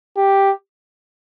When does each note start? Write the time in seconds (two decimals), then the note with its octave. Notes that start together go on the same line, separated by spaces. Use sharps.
0.16 G4